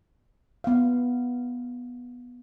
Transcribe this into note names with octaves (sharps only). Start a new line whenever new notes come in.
B3 F5